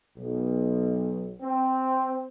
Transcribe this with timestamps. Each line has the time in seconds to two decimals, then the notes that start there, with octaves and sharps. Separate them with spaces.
0.17 B1
1.40 C4